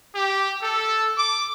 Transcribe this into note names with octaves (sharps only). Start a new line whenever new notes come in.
G4
A4
D6